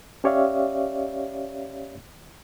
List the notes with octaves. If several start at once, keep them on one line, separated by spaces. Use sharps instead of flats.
C#4 G4 C#5 D5 E5 F5